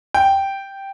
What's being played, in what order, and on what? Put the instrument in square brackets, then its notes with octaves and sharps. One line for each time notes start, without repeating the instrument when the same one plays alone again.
[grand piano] G5